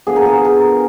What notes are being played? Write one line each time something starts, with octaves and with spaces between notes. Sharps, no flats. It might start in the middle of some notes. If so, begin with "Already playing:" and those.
D3 F3 B3 G#4
A#4
G#4
A#4